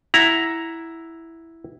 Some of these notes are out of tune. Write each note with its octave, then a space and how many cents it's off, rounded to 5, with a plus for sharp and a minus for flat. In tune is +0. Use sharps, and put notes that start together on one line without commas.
E4 +0 F#5 +0 A#5 +5